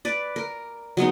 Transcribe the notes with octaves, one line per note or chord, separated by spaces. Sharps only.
B4 D5
A#4
F#3 G#3 B3 D#4